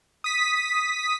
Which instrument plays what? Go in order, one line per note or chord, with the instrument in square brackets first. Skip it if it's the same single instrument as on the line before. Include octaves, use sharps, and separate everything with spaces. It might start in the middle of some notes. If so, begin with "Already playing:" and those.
[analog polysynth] D#6 B6